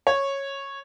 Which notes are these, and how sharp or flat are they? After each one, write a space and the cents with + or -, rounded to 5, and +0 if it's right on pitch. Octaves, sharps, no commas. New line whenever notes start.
C#5 -10